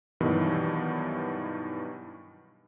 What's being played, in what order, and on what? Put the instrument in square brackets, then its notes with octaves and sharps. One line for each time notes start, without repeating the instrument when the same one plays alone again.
[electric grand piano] G2 B2 D#3 E3 F#3